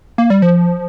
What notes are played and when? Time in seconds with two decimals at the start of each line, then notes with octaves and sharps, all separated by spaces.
0.18 A#3
0.30 G3
0.42 F3